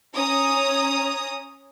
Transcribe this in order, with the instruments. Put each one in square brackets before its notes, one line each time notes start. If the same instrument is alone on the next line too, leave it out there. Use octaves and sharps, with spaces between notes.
[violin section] C#4 A#5 D#6